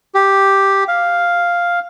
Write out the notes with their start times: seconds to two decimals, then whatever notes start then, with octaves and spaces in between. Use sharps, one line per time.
0.15 G4
0.88 F5